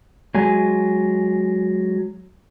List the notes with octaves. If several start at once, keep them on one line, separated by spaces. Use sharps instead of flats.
F#3 G#3 G#5